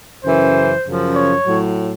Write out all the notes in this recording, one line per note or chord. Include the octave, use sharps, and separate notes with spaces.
F#2 C#3 E3 C5
F#2 C#3 F3
C#5
A2 F#3